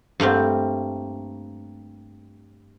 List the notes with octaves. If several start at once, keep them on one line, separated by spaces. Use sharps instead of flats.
G2 A3 A#3 C4